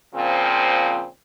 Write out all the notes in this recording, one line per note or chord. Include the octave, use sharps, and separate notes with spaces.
A#2 C#3 F3 C4